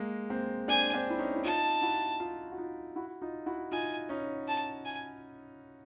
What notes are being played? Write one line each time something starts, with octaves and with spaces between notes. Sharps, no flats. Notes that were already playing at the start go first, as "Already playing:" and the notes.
Already playing: G#3 A#3
A#3 C4
C4 D4 G#5
C4 D4
E4
C#4 D#4
E4
D#4 F4 A5
E4 F#4
D#4 F4
F#4
D#4 F4
E4 F#4
D#4 F4
E4 F#4
D#4 F4 G#5
C#4 D#4
A5
G#5